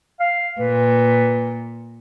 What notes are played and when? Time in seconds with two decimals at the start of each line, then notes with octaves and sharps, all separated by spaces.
0.20 F5
0.59 A#2 B4